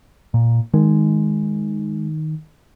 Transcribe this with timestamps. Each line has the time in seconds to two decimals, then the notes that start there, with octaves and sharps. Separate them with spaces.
0.34 A#2
0.74 D#3 G#3